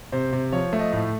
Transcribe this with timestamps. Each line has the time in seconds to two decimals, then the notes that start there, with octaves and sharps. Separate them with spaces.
0.12 C3 C5
0.32 C3
0.52 F3 C#5
0.73 A3
0.79 D#5
0.93 A2